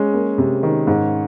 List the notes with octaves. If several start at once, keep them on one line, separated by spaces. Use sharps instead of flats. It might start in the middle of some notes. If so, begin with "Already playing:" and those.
Already playing: G#3 C#4
A#3
C3
D#3
G#2